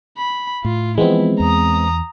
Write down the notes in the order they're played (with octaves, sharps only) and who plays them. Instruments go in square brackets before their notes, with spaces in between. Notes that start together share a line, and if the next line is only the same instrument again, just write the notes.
[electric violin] B5
[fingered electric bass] A2 [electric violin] F4
[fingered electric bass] E3 F3 [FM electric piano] G#3 B3 C4 [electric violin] E4
[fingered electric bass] E2 [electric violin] A#5 D#6